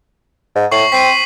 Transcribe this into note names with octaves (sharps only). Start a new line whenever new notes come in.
G#2
A2 C#6 C7 F#7
C4 B6 C7 D#7